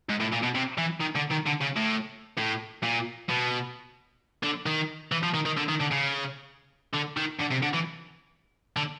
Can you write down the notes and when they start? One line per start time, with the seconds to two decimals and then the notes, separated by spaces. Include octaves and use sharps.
0.10 G#2
0.21 A2
0.33 A#2
0.43 B2
0.55 C3
0.78 E3
1.01 D#3
1.16 D3
1.31 D#3
1.47 D3
1.61 C#3
1.77 A2
2.38 A2
2.83 A#2
3.29 B2
4.43 D3
4.66 D#3
5.12 E3
5.23 F3
5.34 D#3
5.46 D#3
5.57 D3
5.69 D#3
5.80 D3
5.91 C#3
6.94 D3
7.17 D#3
7.39 D3
7.51 C3
7.62 D3
7.74 E3
8.77 D3